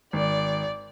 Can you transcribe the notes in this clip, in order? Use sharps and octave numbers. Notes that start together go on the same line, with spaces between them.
G#1 D5